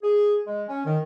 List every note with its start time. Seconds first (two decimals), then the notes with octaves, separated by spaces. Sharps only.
0.02 G#4
0.47 G#3
0.68 C#4
0.85 D#3